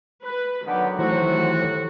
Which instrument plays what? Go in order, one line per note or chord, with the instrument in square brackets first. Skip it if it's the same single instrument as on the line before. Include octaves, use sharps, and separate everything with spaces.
[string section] B4
[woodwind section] D3 B3 G4 [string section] D#3 [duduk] F#3
[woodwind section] A2 C3 F#4 [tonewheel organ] D#3 E3 C5 [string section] A3